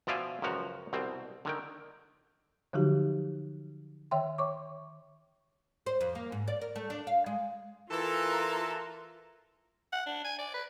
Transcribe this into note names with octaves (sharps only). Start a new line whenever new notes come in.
B2 F3 D5 E5 F5 G#5
C#2 F#2 F3 F#4 A#5
C2 B2 C4
D3 D#3 G5
D3 F3 F#3 D#4 F#4 G4
D#3 C#5 E5 G5 C6
C#5 C#6 D6
C5
F2
A#3
G#2
D5
A#4
A3
D4
F5
G#3
E3 F4 A4 A#4
F#5
D4
G#5
D5
B4